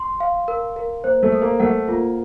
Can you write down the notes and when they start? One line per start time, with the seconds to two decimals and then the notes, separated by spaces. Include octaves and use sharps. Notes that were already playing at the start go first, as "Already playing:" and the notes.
Already playing: C6
0.20 F5
0.48 A#4
0.76 A#4
1.04 A#3 C5
1.23 A3
1.32 A4
1.42 A#3
1.60 A3 F#5
1.88 A#3 F4